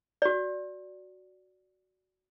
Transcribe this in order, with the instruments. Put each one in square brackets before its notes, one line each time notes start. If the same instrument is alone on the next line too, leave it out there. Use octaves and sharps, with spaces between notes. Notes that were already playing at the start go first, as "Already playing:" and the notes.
[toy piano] F#4 D5